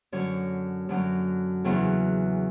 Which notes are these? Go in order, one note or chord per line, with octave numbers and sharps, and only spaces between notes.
F#2 D3 F#3 C#5
F#2 D3 F#3
E2 C#3 F#3